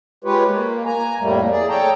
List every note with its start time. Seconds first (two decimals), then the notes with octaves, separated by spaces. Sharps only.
0.24 G#3 F4 G4 B4 C#5
0.48 A#3
0.86 G#5 A#5
1.19 F2 A2 G3 A3 A#3
1.51 G#4 D5
1.69 A4 C#5 G5 A5 A#5